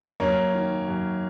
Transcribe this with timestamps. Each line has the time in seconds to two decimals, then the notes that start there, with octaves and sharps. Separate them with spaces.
0.20 F#2 A#3 C#4
0.54 D#3
0.88 F#2